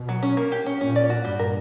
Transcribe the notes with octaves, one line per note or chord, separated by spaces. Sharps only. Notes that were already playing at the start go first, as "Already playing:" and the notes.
Already playing: B2
F#3
C#4
A#3
G4
C#4
A#2 C#4
D5
F#4
G2 G3
A#4